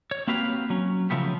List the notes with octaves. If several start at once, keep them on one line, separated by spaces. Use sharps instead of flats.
C#5
A#3 C4 F#4 G4 B4 F5
F#3 C#4
C#3 F3 A3 B3 G4